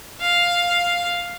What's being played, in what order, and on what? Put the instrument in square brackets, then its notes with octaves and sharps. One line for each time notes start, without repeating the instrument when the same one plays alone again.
[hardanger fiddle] F5